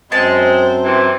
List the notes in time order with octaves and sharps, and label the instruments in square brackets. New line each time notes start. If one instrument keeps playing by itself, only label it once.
[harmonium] F#2 C4 [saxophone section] G#3 [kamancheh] C5 [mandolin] A5
[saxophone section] C3 E3